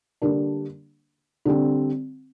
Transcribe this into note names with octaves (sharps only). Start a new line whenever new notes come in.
D3 G3 A#3 D4
D3 G3 C4